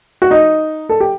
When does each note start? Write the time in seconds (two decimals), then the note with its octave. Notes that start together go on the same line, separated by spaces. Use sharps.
0.22 F#4
0.31 D#4
0.89 A4
1.00 G4